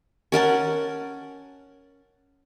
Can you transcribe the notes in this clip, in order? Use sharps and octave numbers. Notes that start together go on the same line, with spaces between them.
C#4 A#4 F#5 A5